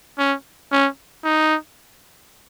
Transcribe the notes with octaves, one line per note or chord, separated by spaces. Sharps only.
C#4
C#4
D#4